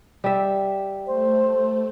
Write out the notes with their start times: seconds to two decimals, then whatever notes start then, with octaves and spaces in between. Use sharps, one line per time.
0.24 G3 E5
1.07 A3 C5